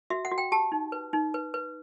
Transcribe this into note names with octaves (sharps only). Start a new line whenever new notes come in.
F#4 E5
F#5
F#4
G5
G4 A5
D#4
B4
D#4
B4
B4